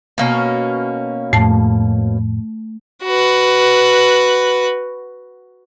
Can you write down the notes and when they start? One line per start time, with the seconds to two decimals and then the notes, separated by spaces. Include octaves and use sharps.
0.18 B2 A#3 C#4
1.33 F2 A2 A3 A5
3.04 F#4 B4